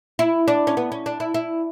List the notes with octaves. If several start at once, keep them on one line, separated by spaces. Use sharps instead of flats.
E4
D4
C#4
B3
C#4
D4
E4
E4